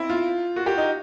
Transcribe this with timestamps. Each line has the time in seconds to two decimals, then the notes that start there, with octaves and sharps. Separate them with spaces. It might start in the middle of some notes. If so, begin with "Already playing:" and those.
Already playing: C4 E4
0.09 F4
0.56 F#4
0.66 G4
0.78 D#4